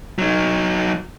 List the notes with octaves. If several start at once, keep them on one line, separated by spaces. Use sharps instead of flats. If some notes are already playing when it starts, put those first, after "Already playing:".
F#3 D#4